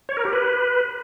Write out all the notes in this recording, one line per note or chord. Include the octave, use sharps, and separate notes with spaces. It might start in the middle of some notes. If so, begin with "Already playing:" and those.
C#5
A#4
G4
B4